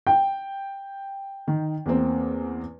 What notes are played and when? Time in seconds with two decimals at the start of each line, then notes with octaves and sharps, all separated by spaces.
0.07 G5
1.48 D#3
1.86 E2 A#3 C4